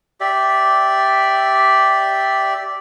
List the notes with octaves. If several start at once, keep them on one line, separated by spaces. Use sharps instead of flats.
G4 D5 E5